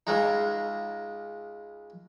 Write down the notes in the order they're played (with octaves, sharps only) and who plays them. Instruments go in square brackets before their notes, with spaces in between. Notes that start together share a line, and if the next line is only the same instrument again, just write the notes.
[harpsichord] C#2 C#3 G#3 D#4